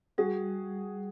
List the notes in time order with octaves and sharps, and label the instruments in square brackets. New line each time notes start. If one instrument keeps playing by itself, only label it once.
[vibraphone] G3 [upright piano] F#4 G#4